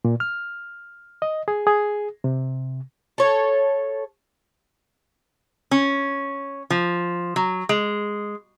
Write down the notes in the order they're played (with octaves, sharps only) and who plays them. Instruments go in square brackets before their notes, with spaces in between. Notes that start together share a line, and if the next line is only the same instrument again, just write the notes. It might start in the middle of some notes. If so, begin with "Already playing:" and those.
[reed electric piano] A#2
F6
D#5
G#4
G#4
C3
[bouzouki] A4 C#5
[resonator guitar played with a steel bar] C#4
F3
F#3
G#3